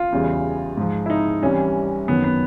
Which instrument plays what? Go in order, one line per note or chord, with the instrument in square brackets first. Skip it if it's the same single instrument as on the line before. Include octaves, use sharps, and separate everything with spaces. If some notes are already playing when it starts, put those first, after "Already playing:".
Already playing: [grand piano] F4
E2 C#3 E3 G3
G#2 F3
E4
D#4
C2 C3 E3 G3 C#4
F#2 D#3 F#3 B3
B3